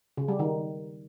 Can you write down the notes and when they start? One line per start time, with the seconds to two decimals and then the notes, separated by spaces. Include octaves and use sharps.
0.17 C#3
0.28 G3
0.39 D#3